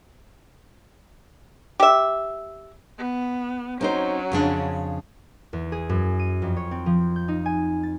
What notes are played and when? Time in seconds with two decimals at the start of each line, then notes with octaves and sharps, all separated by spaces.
1.80 G4 E5
2.98 B3
3.81 F#3 C4 C#4 D#4 C5
4.32 F2 C#3 D4
5.53 E2
5.72 G#4
5.89 F#2
6.19 D#7
6.42 F2
6.57 C#5
6.71 C4
6.86 F3
7.16 G6
7.28 D#4
7.46 G#5
7.83 A6